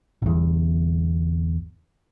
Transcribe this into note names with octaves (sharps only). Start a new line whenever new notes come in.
G1 E2